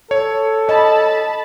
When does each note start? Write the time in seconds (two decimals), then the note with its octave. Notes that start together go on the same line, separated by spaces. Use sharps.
0.11 A4 C#5
0.69 D#5 A5 B5